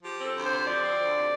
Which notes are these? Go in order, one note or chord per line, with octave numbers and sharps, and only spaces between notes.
F3 G4
C4 A4
D2
C5
C3
F3 D5
C4
D2
C3